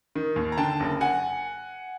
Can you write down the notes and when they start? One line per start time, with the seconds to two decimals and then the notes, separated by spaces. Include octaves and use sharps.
0.15 D#3
0.36 D#2
0.52 A#5
0.58 D3 G5 A5
0.80 F#1
1.01 F#5 G#5